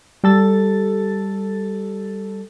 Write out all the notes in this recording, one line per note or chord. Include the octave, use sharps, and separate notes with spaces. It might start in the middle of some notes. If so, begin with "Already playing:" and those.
G3 A4 A6